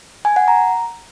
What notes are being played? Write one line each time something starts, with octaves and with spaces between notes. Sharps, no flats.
G#5
F#5
A#5